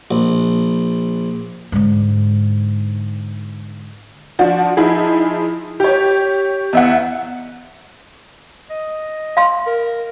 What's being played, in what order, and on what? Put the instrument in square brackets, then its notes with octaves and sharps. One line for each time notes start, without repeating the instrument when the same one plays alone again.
[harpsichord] A#1
[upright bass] G#2 D3
[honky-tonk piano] F3 D4 F#4
F3 D#4 E4 G#4
G4 C#5
E2 E5 F#5
[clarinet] D#5
[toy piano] F5 C6
[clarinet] A#4